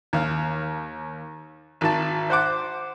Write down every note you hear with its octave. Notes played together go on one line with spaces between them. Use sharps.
D#2 F5
G#1 D#3 A5
C5 F#5 D6